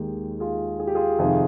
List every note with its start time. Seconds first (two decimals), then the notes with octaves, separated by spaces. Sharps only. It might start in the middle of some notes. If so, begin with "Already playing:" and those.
Already playing: D#2 D#3 G#3 D#4 G4
0.40 F4 G#4
0.79 G#4
0.87 G4
0.95 F4 G#4
1.19 F2 C3 D#3 F4 G#4